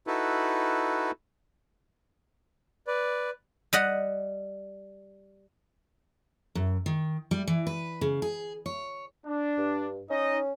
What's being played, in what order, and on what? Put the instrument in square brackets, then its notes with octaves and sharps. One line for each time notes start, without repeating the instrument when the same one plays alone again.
[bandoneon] D#4 E4 F#4 A4 B4
[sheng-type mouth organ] B4 D5
[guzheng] G3 D#5 F#5
[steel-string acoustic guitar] F#2
D#3
G3
E3
B4
C#3
G#4
C#5
[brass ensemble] D4
[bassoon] G2
[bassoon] C#4 [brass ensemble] D#4 D#5